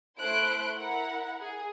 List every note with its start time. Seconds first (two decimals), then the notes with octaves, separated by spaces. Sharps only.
0.19 A3 E4 C5 C6 F#6 D7
0.76 E4 A#4 F#5 A#5
1.40 G#4